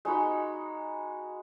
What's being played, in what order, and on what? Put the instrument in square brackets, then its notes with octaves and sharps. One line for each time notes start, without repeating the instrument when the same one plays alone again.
[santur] G#3 D#4 F#4 B5